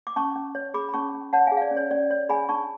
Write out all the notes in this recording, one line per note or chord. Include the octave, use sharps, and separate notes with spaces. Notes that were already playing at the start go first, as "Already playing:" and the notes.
D6
C#4 A5 C#6
C#4
C#5
G#4 B5 D6
B5
C#4 A5 C#6
C#4
C#5 F#5 A5
G#4 F5 G#5
F5
D5
C#4
C#5
C#4 D5
C#5 D5
G#4 G#5 B5
D4 A5 C#6